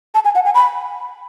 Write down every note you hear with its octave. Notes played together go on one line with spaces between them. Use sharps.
A5
G#5
F#5
G#5
B5